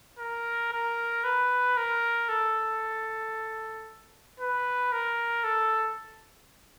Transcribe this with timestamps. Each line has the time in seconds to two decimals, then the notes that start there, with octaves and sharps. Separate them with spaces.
0.19 A#4
0.72 A#4
1.24 B4
1.77 A#4
2.29 A4
4.40 B4
4.92 A#4
5.44 A4